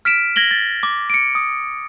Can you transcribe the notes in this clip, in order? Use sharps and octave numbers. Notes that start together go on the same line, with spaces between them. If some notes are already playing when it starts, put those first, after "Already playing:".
F6 B6 D7 E7
G#6 A#6 F#7 G7
A6
D6
C#7 D7
D#6